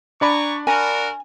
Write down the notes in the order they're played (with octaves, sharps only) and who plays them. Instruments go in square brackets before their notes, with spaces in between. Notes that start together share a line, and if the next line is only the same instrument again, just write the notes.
[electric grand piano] D4 D5 B5 [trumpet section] G#5 A#5 C#6
[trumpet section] F#4 A#4 [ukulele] G#5